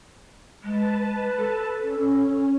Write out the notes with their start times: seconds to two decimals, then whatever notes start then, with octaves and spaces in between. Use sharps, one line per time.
0.63 G#3 B4 A5
1.38 A4
1.78 C#4